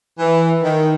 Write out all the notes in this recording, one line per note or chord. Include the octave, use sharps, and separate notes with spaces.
E3
D#3